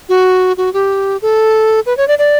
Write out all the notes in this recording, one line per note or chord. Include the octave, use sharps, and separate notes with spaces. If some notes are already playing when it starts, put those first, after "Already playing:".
F#4
F#4
G4
A4
B4
C#5
D5
D5